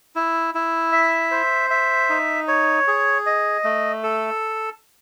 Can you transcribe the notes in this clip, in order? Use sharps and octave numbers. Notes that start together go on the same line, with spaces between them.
E4
E4
E5
C5
E5
D#4
C#5
G#4
D#5
A3
A4